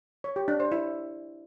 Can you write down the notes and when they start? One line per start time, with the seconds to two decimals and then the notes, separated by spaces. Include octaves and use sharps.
0.24 C#5
0.36 G4
0.48 D4
0.60 C5
0.72 E4